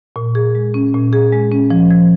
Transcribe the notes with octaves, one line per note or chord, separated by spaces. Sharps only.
A#2
G#4
G#3
C#4
A#2
G#4
G#3
C#4
F3
F3